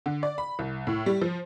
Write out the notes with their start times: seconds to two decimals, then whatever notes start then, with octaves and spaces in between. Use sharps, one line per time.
0.06 D3
0.23 D5
0.38 B5
0.59 C2
0.87 A2
1.06 G3
1.22 F3